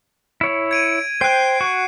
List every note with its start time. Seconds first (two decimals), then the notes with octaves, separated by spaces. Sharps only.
0.41 E4 C#5
0.71 G#6 D7 D#7
1.21 C5 G5 F#6 C7
1.61 F#4 C#6